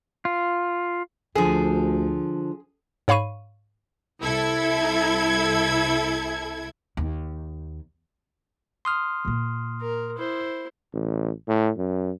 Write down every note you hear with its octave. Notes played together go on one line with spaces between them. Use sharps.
F4
D2 D3 F3 G#4
G#2 C#5 F5 B5 C#6 D#7
C2 E4 A4 G#6
D#2
C6 D#6 F6
A#2 A#3
A#4
E4 C5
A1
A2
F#2